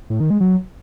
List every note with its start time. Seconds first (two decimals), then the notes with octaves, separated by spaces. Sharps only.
0.10 A2
0.20 D#3
0.30 G#3
0.41 F#3